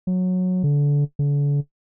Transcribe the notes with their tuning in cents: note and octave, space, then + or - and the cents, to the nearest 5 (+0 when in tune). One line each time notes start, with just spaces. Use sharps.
F#3 -15
D3 -25
D3 -40